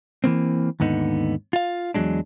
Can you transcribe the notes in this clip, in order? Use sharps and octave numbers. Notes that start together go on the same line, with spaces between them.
E3 A#3 C4
D#2 G#2 D3 B3 D#4
F4 F5
E2 G2 F#3 G#3 D4